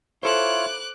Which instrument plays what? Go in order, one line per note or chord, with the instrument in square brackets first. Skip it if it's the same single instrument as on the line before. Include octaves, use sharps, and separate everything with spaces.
[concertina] E4 F4 C#5 [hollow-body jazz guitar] A4 C5 [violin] D6 F#6